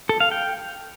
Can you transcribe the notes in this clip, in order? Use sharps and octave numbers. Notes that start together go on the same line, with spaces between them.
A4
F5
G5